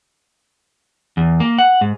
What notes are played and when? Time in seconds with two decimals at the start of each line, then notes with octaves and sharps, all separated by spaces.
1.17 E2
1.40 A#3
1.58 F#5
1.81 G#2